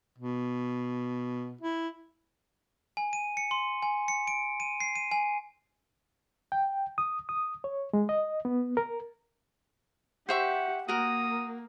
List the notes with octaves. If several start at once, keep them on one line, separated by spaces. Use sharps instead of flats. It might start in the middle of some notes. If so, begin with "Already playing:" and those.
B2
E4
G#5
D#7
C#7
C6
G#5
C#7
D7
D#7
C7
D#7
G#5
G5
D#6
D#6
C#5
G#3
D#5
B3
A#4
G4 C5 E5 F#5 C#6
A#3 F#4 A#4 D#6